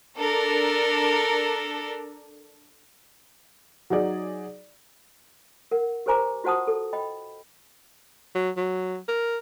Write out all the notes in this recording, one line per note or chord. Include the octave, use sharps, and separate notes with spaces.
D4 A4 A#4
F#3 D#4 G#4 D5
A#4 F#5
G4 A#4 C5 G#5 A#5 D6
F4 F#4 C5 F#5 A5 D#6
A4
D#5 G5 B5
F#3
F#3
A#4